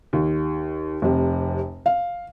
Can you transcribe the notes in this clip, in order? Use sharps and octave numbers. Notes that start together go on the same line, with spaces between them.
D#2
F1 C3
F5